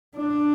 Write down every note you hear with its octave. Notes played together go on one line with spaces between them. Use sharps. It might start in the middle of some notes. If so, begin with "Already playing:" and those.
D4